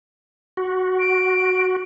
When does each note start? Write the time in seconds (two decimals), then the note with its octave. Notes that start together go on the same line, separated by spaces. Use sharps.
0.57 F#4
0.99 D7